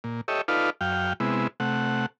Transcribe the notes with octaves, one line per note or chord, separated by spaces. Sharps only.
A#2
G4 A4 C#5 D#5 E5
D#4 F4 A4 B4 D5 F5
F#2 F5 G5
C3 G#3 B3 E4
C3 A3 F#5